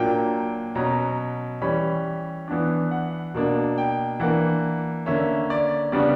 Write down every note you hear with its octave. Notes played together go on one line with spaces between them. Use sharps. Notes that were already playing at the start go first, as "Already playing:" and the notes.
Already playing: A#2 F#3 A#3 D4 G5
B2 F#3 C#4 A#5
E3 G3 C#4 B5
E3 B3 D4
F#5
B2 A#3 D4
G5
E3 A#3 D4 F#5
D3 A#3 C#4 E5
D5
C#3 G3 B3 D4 D5